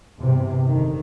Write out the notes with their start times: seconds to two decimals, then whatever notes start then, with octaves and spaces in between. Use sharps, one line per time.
0.18 E2 G2 C3
0.66 F1 D3 D#3